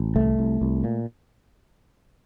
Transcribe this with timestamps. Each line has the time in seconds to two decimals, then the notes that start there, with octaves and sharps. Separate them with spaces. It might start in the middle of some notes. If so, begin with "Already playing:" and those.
Already playing: A1
0.16 C2 A3
0.39 C2
0.62 C2
0.84 A#2